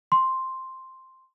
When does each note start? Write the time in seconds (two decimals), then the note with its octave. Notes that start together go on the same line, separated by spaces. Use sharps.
0.12 C6